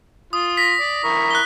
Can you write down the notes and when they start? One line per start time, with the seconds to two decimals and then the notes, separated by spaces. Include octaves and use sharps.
0.33 F4 D#6
0.57 A#6 B6
0.80 D5
1.04 E4 A#4 C#6
1.31 F#6 G7